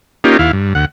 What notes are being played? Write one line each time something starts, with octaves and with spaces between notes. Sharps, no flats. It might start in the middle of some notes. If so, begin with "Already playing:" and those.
A#3 C#4 D#4 F4 G4
D#2 E4 F5
G2
D2 F#5